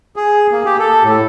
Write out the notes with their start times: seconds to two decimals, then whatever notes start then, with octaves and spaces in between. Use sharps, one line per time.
0.16 G#4
0.51 A#3
0.65 G4
0.79 A4
1.04 A2